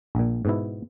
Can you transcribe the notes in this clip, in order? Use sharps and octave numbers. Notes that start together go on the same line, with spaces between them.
A#1 A#2
G#2 B2 E4